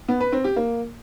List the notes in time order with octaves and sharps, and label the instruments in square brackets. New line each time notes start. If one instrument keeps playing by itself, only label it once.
[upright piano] B3
B4
C4
G4
A#3